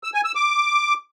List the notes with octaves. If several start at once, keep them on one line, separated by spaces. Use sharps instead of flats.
E6
G#5
E6
D6